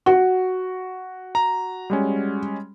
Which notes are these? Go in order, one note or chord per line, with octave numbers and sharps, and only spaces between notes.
F#4
A#5
G3 G#3 C#4